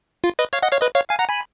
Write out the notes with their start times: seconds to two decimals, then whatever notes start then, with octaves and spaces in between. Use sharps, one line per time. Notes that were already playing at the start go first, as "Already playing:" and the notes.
0.24 F4
0.39 B4 D#5
0.53 C#5 F5
0.62 D#5 F#5
0.72 C#5 F5
0.81 B4 D#5
0.95 C#5 F5
1.10 F5 G#5
1.19 F#5 A#5
1.29 G#5 B5